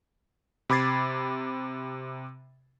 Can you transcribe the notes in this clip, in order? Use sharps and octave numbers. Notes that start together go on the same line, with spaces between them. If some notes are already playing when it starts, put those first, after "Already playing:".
C3 B5 D6 G#6 A6 C7